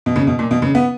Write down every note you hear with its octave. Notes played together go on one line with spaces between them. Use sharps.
B2
C#3
B2
A#2
B2
C#3
B3